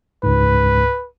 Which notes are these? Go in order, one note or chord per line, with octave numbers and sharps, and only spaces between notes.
C#2 G#2 B4